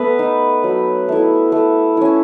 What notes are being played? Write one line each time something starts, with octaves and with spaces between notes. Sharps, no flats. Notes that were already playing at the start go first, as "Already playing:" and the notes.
Already playing: A3 B3 B4
D#4
F#3
A3 E4
A3
C#4 E4